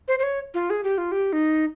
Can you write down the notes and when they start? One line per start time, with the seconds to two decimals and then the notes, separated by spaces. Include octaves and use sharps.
0.08 C5
0.19 C5
0.23 C#5
0.54 F4
0.70 G#4
0.83 G4
0.98 F4
1.12 G4
1.33 D#4